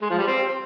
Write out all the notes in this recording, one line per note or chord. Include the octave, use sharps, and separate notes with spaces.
G#3
F3
G3
C4